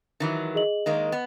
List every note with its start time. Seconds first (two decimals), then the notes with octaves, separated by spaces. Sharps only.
0.20 D#3 E3 F#3
0.55 G#4 D#5 F#7
0.86 D#3 G#3 A#3 D#5
1.12 B3